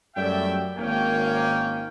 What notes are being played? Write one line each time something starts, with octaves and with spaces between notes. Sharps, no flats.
F#2 G3 A3 D5 E5 G5
G#1 A#3 C#4 G5